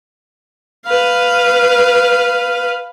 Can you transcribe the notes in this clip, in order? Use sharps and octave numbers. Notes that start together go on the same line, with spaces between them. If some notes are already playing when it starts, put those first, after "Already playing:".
B4 F5